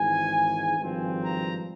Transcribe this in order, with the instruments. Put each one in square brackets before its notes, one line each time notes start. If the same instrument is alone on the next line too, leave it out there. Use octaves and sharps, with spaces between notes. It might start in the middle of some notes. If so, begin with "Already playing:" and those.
Already playing: [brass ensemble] G#1 G#2 E3 G#5
G#1 G2 F3 C4
A#5